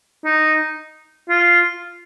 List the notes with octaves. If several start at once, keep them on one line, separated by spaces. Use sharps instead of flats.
D#4
F4